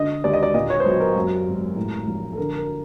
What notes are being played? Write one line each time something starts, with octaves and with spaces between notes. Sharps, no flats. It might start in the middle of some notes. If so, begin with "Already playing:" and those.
Already playing: D3 D#5
D#2 D5
D#5
D5
A#2 D#5
C#5
C5
B1 B4
A#4
F#2
G#1
A2
A#1
A4
D3 A#4
A#4